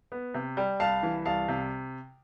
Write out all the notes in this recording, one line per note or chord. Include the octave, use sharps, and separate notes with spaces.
B3
C3
G3
C2 F5 A5
E3
C2 F5 A5
C3